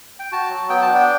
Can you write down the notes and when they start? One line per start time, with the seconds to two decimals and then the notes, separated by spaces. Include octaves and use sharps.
0.19 G5
0.32 F#4 A5
0.50 F#3
0.69 B3 G5
0.82 A5
0.88 D4
0.95 G5